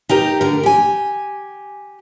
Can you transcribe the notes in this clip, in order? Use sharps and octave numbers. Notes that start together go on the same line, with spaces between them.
D#4 G4 A#4
D3 A#4
G4 G#5